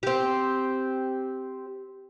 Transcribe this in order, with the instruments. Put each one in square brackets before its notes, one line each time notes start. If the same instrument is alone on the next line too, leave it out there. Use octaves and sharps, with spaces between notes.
[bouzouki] C4 G4